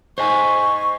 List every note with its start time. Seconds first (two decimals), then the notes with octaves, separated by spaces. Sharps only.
0.18 C5 D#5 G#5 C#6